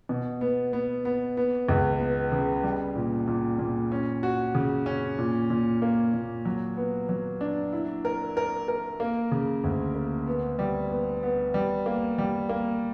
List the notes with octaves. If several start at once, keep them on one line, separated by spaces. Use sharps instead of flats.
B2
B3
B3
B3
B3
C#2
B3
C#3
G3
A#2
A#2
A#2
C#4
F#4
C#3
C#4
A#2
A#2
A#3
A#2
F#3
B3
F#3
D4
E4
A#4
A#4
A#4
A#3
C#3
D2
A#3
B3
G3
B3
B3
G3
A#3
G3
A#3